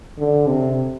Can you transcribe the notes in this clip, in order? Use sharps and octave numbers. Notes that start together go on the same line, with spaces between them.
D3
C3